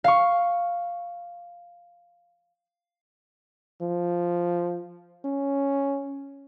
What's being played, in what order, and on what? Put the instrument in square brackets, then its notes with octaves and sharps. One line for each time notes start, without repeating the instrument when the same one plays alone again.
[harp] F5 C#6
[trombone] F3
C#4